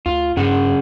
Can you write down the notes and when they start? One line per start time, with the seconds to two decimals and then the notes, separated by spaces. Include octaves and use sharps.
0.06 D2 F4
0.37 G2 C#3 G#4 F#5